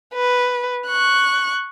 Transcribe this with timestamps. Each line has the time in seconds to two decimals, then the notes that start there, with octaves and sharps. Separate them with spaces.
0.14 B4
0.88 C#6 F#6